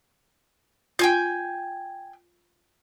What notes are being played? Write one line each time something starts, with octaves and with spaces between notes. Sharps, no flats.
F4 G5 G#5 G6